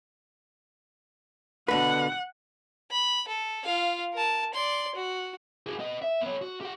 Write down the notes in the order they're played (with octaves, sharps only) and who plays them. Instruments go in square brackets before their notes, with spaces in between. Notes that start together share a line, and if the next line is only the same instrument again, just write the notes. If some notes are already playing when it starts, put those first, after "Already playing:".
[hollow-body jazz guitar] B2 D3 B4 [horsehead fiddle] F#5
[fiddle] B5
A4
F4 F5
A#4 A5
D5 C6
F#4
[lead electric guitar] F#4 G#4
B3 D#5
E5
B3 C#5
F#4
G4 F#5